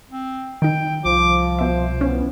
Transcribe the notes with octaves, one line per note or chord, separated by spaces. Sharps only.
C4
D#3 D#4 G5
C2 F3 D6
B2 C5 E5
E3 B3 C#4